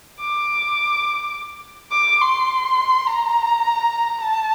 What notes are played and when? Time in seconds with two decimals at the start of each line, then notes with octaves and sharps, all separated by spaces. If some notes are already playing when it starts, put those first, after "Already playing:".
0.20 D6
1.92 D6
2.21 C6
3.07 A#5
4.22 A5